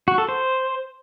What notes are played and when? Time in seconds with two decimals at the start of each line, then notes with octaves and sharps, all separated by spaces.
0.08 F#4
0.18 A4
0.29 C5